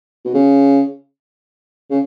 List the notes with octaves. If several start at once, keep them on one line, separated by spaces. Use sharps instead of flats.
B2
C#3
C#3